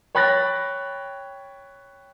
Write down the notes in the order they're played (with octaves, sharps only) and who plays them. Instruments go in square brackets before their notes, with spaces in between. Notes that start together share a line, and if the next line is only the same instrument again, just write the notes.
[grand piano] C#5 G5 B5 F#6 A6 A#6